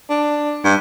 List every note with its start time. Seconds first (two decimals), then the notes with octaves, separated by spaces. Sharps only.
0.10 D4
0.64 G2